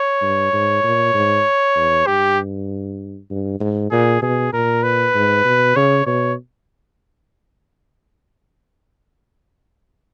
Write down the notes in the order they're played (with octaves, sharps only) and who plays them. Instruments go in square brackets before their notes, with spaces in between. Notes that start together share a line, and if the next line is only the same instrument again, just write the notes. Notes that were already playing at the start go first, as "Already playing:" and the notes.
Already playing: [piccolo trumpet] C#5
[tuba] G2
G#2
A#2
G#2
E2
[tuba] G2 [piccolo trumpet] G4
[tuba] G2
G#2
[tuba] A#2 [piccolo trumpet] G#4
[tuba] B2 [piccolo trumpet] G#4
[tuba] A#2 [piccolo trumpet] A#4
[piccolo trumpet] B4
[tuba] G#2
B2
[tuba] C#3 [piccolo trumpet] C#5
[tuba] B2 [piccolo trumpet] C#5